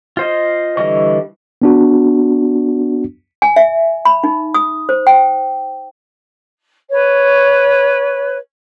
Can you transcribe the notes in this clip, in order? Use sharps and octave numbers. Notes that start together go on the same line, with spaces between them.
F4 C5 D#5
D3 E3 G3 D#5 C#6
B3 D4 F#4
G#5
E5
B5
D#4
D#6
C5
G5
B4 C#5